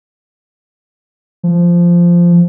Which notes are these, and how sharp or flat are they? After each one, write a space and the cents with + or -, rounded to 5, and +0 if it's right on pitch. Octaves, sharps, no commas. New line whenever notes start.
F3 -10